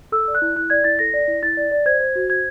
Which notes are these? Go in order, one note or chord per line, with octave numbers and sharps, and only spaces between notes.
A4 E6
D5
F#6
E4
E4 F#6
D5 G#6
E4 A6
A4 A#6
D5
E4
E4 A6
D5
D5
C5 G#6
C5
F#4
C5 G#6